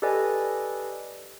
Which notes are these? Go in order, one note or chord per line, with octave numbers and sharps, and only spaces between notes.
G4 A4 B4 D5 D#5 G#5